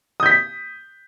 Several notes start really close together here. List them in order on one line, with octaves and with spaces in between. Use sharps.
D#6 G6 B6